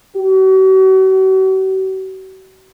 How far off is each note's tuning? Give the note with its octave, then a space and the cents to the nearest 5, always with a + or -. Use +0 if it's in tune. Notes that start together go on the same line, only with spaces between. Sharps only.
F#4 +45